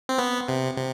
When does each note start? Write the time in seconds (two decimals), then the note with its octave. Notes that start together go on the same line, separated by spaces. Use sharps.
0.09 C4
0.18 B3
0.48 C3
0.78 C3